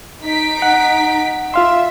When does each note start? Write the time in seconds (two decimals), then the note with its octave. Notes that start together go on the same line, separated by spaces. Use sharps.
0.25 D#4 B6 D7
0.62 F#5
1.54 F4 E5 F5 C6